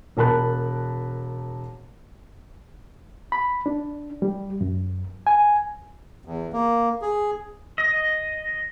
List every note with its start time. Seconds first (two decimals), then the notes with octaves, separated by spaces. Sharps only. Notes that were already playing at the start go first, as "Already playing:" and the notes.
0.17 E1 A#4 A5 B5 F#6
3.32 B5
3.66 D4
4.22 G3
4.61 F#2
5.27 G#5
6.25 E2
6.53 A#3
7.02 G#4
7.78 D#5